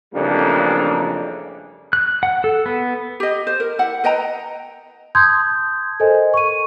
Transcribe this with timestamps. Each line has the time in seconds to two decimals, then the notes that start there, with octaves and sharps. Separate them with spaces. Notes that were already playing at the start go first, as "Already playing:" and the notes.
0.14 A1 F2 C#3 G3 A#3 D4
1.93 F#6
2.23 F#5
2.44 A4
2.66 B3
3.20 G4 D#5
3.47 C5
3.60 A#4
3.79 E4 F#5
4.04 B4 D#5 G5 A#5
5.15 A5 C6 D#6 G6 G#6
6.00 A4 A#4 C5 D#5 G#5
6.34 C#6 D#7